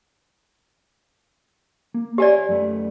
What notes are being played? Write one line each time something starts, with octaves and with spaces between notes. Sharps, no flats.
A#3
G4 C#5 D5 E5 G#5
F#2 A3 B4